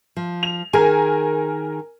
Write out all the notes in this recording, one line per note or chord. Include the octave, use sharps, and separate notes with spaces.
F3
F7
D#3 G#4 A#4 G#5